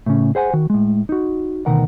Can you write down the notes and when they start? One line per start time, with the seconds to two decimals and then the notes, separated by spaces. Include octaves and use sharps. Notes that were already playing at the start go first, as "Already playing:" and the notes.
0.06 A2 C#3 C#4
0.35 G#4 C5 F#5 G#5
0.53 D#3 F#4
0.70 A2 G#3
1.09 D#4 F#4
1.66 D2 B2 D#3 A#4 F#5